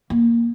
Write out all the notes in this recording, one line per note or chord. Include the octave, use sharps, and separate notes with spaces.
A#3